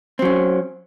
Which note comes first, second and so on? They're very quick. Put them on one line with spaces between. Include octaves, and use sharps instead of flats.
C4 F#3 C#4